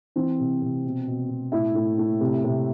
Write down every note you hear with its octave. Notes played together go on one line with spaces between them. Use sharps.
E3 C4 C5
C3
C3
B2
B2
B2
A2 E4 E5
A2
A2
C3
C3